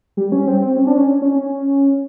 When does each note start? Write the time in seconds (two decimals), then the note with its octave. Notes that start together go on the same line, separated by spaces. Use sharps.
0.17 G3
0.32 C#4
0.47 C4
0.62 C4
0.76 C#4
0.87 D4
0.96 C#4
1.22 C#4